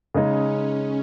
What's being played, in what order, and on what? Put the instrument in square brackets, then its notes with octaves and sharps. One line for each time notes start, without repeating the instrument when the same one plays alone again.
[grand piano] C#3 G#3 D#4 [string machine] C#4